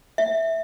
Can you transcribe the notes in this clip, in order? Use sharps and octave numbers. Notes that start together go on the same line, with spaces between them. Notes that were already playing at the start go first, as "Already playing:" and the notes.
E5